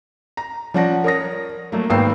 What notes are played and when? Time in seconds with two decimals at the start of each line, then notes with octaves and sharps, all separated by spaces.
0.37 A#5
0.74 F3 C#4 D5 F#5 A5 A#6
1.04 A#4 C#5 D#6 A#6
1.72 F#3 A3 A#3
1.90 G#1 A#3 B3 G5 E6 C7